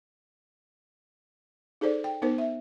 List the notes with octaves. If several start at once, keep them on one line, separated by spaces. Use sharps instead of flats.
D#4 G#4 A4 C5 D5
G5
B3 D#4 A#4 C5
E5